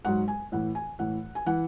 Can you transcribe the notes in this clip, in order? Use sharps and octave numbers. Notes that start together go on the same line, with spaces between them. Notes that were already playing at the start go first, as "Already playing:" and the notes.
G#2 F#3 F#5
G#5
A2 E3 F#5
G#5
A2 E3 F#5
G#5
E3 F#5